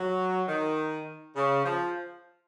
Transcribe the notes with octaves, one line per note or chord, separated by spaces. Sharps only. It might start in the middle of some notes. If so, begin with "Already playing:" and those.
Already playing: F#3
D#3
C#3
F3